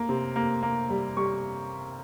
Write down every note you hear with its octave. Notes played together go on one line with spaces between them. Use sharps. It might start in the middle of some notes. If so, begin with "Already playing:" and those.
Already playing: A#3
C3
A#3
A#3
G3
G3 C#6